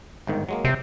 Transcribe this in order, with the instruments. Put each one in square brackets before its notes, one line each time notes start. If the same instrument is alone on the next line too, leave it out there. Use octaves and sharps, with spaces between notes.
[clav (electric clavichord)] G1 G#2 D#3
F#3 G#3 A#3
[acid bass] C3